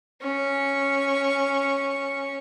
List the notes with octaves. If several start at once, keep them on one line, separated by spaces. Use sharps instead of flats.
C#4 C#6